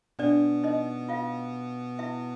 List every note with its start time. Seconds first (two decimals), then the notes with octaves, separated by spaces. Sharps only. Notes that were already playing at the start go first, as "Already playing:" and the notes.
0.19 B2 B3 D4 D5
0.64 D#4 D#5
1.09 F4 F5
1.99 E4 E5